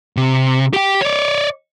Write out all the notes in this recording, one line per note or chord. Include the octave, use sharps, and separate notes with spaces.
C3
G4 G5
C#5 D5